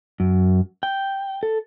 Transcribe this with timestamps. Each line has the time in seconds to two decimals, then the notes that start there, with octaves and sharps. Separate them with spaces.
0.20 F#2
0.83 G5
1.43 A4